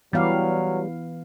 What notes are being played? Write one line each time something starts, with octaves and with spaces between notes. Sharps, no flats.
E3 F#3 G3 B3 F5